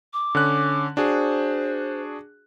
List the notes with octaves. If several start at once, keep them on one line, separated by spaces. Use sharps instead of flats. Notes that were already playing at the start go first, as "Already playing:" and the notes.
D6
D3 C#4 F#6
D4 F#4 G#4 C5